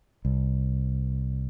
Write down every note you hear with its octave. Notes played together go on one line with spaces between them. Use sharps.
C2